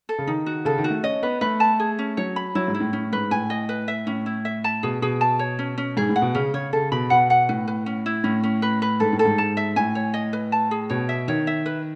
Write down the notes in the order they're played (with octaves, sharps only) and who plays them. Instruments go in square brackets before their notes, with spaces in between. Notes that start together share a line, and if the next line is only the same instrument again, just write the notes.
[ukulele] A4
[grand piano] C#3
[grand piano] D#3 [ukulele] D#4
[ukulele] F#4
[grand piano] C#3 [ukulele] A4
[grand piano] D#3
[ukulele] F#4
[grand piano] A3
[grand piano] C#4 [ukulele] D#5
[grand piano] B3 [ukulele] B4
[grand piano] A3 [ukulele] B4
[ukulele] A5
G#4
C#4
[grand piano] F#3 [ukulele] C#5
[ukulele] B5
[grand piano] F#3 [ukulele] E4
[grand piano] G#2
[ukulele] E4
[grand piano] A2
[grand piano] A2 [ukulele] C#4
[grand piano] G#2 [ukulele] B4
[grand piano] A2 [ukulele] G#5
[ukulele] D#5
B4
E5
[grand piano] A2 [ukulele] C#4
[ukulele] E4
E5
A5
[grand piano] B2 [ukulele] G#4
[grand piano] B2 [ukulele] G#4
[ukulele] A5
C#5
C#4
C#4
[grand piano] G#2 [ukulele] G#4
[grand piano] A2
[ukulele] F#5
[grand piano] B2
[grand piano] C#3 [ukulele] C#4
[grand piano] C#3 [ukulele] C#5
[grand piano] C#3 [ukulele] A4
[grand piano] B2 [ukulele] B5
[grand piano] B2 [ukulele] F#5
[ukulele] F#5
[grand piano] A2 [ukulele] B4
[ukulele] B4
C#4
E4
[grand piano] A2 [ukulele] C#4
[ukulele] C#4
B4
B4
[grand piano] G#2 [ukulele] A4
[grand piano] A2
[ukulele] A4
[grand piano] G#2
[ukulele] A5
E5
[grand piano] A2 [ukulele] G#5
[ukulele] C#5
D#5
B4
A5
G#4
[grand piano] B2 [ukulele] C#5
[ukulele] E5
[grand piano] D#3 [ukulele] C#5
[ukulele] E5
B4